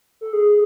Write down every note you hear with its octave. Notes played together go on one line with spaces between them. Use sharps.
A4
G#4